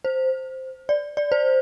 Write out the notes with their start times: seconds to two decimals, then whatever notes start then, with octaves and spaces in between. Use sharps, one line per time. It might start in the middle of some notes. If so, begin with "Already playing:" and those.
0.05 C5
0.89 D5
1.17 D5
1.32 C5